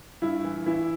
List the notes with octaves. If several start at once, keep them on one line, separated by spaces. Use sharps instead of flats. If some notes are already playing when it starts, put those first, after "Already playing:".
G2 E4
E3
E3 E4